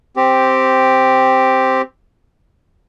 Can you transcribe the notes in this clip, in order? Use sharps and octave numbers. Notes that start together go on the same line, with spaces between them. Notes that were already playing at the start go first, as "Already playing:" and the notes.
C4 G4